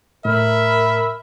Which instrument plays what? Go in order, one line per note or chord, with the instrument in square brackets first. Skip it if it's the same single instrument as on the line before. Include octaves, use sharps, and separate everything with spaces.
[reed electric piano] A2 [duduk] A#4 [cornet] E5 [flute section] B5 F6